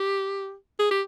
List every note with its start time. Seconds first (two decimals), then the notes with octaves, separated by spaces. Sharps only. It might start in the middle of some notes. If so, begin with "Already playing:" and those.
Already playing: G4
0.79 G#4
0.91 G4